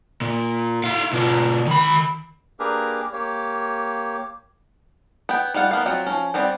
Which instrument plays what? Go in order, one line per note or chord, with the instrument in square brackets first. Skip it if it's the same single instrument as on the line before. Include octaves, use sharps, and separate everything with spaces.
[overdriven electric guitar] A#2
E4 F5
B2 F4
D#3 B5
[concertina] A#3 D4 G4 G#4 A#4 B4
A#3 G4 C#5
[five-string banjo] B3 G5
G3 F4 F5 F#5
A#3 B3 F5
F#3 C4 F4 F#4
F3 C#4
G3 B3 C4 D5